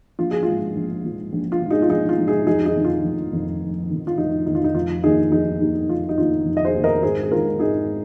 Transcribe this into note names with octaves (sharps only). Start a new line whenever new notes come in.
A#1 F4
G#4
G#2 F3 F4
A#1
G#2 F3
A#1
F4
G#2 F3
D#4 G#4
F4
A#1 D#4 G#4
F4
G#2 F3
D#4 G#4
F1 D#4 G#4
D#4 G#4
F2 D#3
F4
F1
F2 D#3
F1
F2 D#3
F4
F1 D#4
F2 D#3 D#4
F4
D#4
F1 F4
F4
D#2 D#3 D#4 G#4
F1 D#4 G#4
D#2 D#3
F1 F4
D#4
D#2 D#3 F4
F1
D#5
G#4 C5
D#2
D#3 A#4 D#5
G#1 G#4 C5
G#4
G#2 D#3 F4 A#4
G#1 D#4 G#4